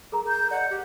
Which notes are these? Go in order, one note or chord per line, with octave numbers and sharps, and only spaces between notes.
G#4 A#4 A#5
G6
D5 D#5 F#5
G4